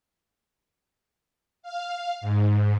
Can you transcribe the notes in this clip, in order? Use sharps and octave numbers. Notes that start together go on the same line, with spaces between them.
F5
G#2